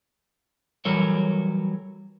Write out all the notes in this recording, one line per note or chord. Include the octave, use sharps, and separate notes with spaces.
E3 F#3 G3 A4 A#4 C#5